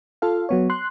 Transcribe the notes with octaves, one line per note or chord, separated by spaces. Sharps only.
F4 A4 F5
F#3 B3 C#5
C6 F#6